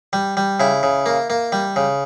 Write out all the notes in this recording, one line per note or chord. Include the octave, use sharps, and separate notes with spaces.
G3
G3
C#3 E4
C#3
A#3
A#3
G3
C#3